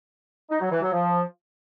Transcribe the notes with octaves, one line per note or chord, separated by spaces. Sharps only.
D#4
F#3
E3
F#3
F3